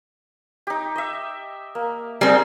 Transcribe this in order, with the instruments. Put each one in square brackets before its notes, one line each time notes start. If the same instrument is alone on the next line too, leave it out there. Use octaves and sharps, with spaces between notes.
[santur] D#4 G4
D#5 E5
A#3
[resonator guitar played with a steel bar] G3 C4 [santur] D#4 G#4 A#4